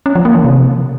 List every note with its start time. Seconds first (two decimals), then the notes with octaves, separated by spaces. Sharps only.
0.06 C#4
0.15 F3
0.25 A#3
0.35 E3
0.45 C3